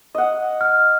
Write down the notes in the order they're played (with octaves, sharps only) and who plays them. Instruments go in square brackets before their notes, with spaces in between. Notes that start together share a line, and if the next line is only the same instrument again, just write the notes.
[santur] D#5 F#5
[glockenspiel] F6